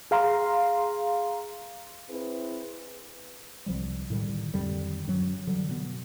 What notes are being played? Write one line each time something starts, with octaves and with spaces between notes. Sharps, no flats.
G#4 F5 A#5 C6
C4 E4 G#4 B4
C2 F3 G3
A2 D3 D#3 G3
F2 D3 D#3 G3
F#2 F#3
D3 E3 F#3 G3
B2 B3